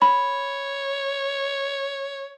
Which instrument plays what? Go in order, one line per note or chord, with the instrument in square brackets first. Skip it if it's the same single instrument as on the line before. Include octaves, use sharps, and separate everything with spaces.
[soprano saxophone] C#5 [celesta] B5